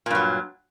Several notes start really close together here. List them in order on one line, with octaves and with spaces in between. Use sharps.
A#2 G2 F#3